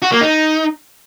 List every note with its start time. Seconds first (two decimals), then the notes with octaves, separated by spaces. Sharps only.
0.02 F#4
0.12 A#3
0.21 D#4